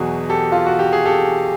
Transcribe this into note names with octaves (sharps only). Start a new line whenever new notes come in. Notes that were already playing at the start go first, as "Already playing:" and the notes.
Already playing: E2 B2 F#3 F#4 G#4
G4 A4
F4
F#4
G4
G#4
G4 A4